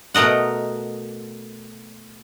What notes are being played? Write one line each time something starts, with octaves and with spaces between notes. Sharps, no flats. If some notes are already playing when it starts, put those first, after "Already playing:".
B2 A3 A#4 D#5 F#5